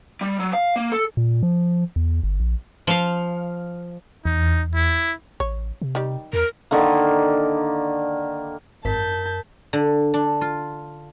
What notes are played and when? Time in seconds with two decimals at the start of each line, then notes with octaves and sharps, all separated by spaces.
0.21 G3
0.40 F#3
0.53 F5
0.76 A#3
0.92 A4
1.17 A#2
1.43 F3
1.96 E2
2.23 G1
2.40 A#1
2.87 F3 F5
4.25 E2 D#4
4.75 E4
5.40 A1 C#5
5.82 C3
5.95 D#3 G3
6.33 E2 A#4
6.71 D3 D#3 A#3
8.85 G#1 F#2 A#4 A5 G6 B6
9.73 D3
10.14 D4
10.41 F4